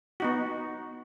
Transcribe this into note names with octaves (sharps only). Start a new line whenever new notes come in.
B3 D#4 F#4